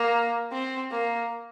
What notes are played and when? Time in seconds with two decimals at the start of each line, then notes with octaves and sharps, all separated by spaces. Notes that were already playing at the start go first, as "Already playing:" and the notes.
Already playing: A#3
0.52 C4
0.91 A#3